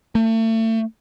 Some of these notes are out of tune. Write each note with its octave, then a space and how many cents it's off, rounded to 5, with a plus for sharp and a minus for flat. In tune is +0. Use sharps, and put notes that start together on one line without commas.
A3 +35